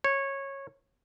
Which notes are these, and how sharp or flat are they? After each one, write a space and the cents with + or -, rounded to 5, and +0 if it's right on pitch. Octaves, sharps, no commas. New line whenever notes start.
C#5 -15